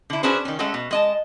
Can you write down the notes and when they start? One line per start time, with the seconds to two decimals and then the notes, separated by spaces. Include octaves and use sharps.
0.10 D3 E4
0.23 C#4 D4 F#4 G#4 B4 C5
0.45 D#3 C#4
0.59 G#3 A3 C#4 A4 F#5
0.74 B2
0.91 G#3 D#5 A5